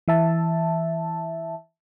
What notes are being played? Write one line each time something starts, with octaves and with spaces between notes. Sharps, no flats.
E3 E5 A5